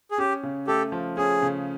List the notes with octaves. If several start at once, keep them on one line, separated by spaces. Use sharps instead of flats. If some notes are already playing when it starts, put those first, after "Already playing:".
G#4
C#4 G4
C#3
A3 G4 A4
F3
C#4 G#4
C#3